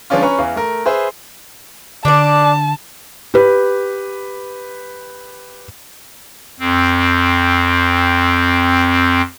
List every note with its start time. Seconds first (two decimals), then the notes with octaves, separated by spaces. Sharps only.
0.10 F3 G#3 B3 C#4 D4 F4
0.22 C#4 B4 A#5 C#6
0.38 E2 E3 F5
0.55 A3 A#4
0.86 G#4 B4 C5 E5
2.05 D3 D4 D5 A5
3.34 G4 B4
6.60 F2 C4